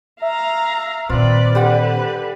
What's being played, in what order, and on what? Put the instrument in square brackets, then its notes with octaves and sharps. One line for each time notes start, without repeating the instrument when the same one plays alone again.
[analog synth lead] E5 [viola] F5 A#5
[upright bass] A#2 D#3 [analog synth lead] C4 [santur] F4 [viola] B4 D5
[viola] D3 B4 [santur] G3 F#5 D6